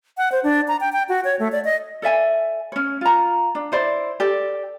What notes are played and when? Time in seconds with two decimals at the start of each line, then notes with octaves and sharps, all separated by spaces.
0.18 F#5
0.32 C5
0.43 D4
0.68 A#5
0.80 G5
0.93 G5
1.09 F#4
1.24 C#5
1.39 A3
1.52 D5
1.65 D#5
2.02 A4 D5 E5 G#5
2.72 C#4 C#5
3.01 F4 A#5
3.55 D4
3.72 E4 C5 D5
4.20 G4 A4 D5